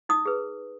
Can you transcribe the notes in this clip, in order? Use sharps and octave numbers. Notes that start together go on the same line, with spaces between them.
D#4 D#6
G#4 B4